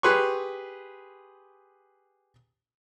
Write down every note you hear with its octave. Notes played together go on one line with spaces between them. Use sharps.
G4 G#4 B4 C6 C#6